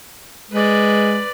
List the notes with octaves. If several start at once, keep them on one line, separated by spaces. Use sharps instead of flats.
G#3 B4 D5